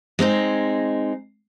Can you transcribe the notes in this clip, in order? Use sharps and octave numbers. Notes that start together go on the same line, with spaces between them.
G#3 C4 D#4 G#4